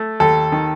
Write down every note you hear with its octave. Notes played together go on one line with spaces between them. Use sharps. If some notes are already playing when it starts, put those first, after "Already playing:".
Already playing: A3
D#2 A4
D#3